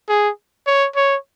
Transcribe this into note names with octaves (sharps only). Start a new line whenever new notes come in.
G#4
C#5
C#5